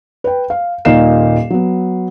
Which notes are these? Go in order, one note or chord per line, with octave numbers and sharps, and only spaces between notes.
B4 G5
F5
D#1 A#2 D#4 F5 C7 E7
F#3 B3